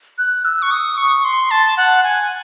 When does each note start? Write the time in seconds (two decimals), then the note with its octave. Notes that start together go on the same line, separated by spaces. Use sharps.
0.18 F#6
0.45 E6
0.62 C#6
0.71 D#6
0.97 C#6
1.24 C6
1.51 A5
1.77 F#5
2.03 G#5